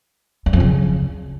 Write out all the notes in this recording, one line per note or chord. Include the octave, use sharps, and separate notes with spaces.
E2
F2
C#3